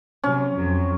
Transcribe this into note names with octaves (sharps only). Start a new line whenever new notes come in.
C3 F#3 C#4
F2 F#3